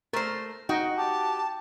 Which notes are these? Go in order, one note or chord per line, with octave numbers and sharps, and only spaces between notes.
A3 A#4 C5
D#4 F#4 D#5 G5
G4 A5